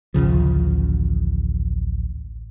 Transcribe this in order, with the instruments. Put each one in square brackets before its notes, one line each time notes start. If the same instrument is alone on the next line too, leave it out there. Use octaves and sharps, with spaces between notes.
[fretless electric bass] A1 D2 C#3 F3